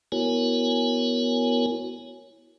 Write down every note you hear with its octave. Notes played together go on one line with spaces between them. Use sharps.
B3 E4 F#4 A#4 C#5 G#5